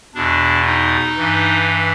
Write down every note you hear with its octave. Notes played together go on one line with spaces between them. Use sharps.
E2 B2 D4
D#4
G2 E3